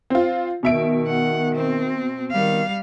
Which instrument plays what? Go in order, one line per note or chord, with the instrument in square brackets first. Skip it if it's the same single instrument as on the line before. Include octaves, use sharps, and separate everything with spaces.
[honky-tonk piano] C4 F4
[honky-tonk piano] B2 E5 D7 [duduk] D#3
[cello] F#5
C4
[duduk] D#3 [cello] G3 F5